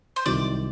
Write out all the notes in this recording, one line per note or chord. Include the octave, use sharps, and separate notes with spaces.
C5
C2 C3 D#3 F#3 D5